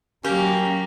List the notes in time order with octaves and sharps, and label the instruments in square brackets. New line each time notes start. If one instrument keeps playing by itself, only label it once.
[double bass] F#3 [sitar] A#3 [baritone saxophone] C#4 [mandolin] G4